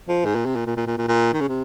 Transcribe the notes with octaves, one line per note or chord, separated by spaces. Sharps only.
F3
G#2
A#2
C3
A#2
A#2
A#2
A#2
A#2
A#2
D#3
C#3
C3